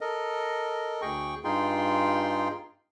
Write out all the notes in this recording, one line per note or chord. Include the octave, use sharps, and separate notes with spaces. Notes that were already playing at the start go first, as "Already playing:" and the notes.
A4 A#4 D#5
D2 G#4 G5 C#6
G2 D#4 F4 G#4 G5 C6